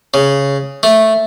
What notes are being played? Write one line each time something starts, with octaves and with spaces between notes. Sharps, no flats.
C#3
A3